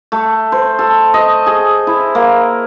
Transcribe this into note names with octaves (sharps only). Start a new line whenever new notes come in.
A3
C5
A4
D#5
G#4
E4
A#3